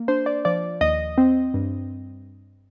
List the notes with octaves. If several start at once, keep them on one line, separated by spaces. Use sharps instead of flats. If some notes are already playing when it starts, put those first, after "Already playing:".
Already playing: A#3
D4 C5
D5
F3 D5
D#2 D#5
C4
G2